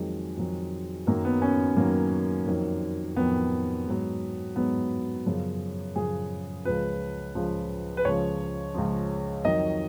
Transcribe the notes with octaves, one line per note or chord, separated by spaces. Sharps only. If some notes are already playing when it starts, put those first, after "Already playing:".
Already playing: F2 D#3 F#3 G#3
F2 D#3 F#3
F#2 D#3 F#3 A#3
B3
C#4
F#2 D#3 F#3 A#3
F2 D#3 F#3
F2 D#3 F#3 B3
G#2 F#3
G#2 F#3 B3
F#2 C#3 F3
F#2 C#3 F3 G#4
C#2 C#3 F3 B4
C#2 C#3 F3
B4
C#2 C#3 F3 C#5
C#2 C#3 F3
F2 D#3 F#3 D#5